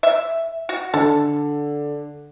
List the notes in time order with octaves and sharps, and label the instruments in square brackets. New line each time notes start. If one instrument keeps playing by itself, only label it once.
[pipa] E5
F#4
[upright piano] D3 [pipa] A4